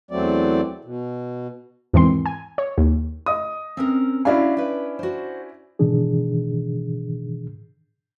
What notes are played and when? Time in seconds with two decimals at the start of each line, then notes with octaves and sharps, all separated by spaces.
0.11 E2 F#3 A3 C4 D5
0.85 B2
1.93 E2 G#2 D#3 E3 C4 C6
2.26 G#5
2.58 C#5
2.78 D#2
3.26 D#5 D#6
3.77 C4 C#4 A#4
4.25 C#4 D4 E4 F#4 E5 F5
4.57 B4 G5
4.99 F#4 C5
5.79 G#2 B2 D#3 E3 D4 G#4